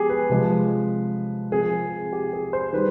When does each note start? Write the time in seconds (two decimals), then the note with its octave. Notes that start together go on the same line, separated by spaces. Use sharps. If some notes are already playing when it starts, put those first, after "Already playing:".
Already playing: F3 G#3 B3 G4 G#4
0.09 B4
0.30 C3 F3 G#3
1.51 F3 C4 G#4
2.13 G4
2.33 G#4
2.53 C5
2.73 D#3 G3 B4